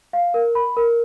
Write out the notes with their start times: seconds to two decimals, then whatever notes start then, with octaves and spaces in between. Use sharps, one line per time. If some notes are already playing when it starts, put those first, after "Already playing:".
0.13 F5
0.34 A#4
0.55 B5
0.77 A#4